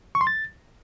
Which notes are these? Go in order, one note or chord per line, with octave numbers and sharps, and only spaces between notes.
C#6
C6
A6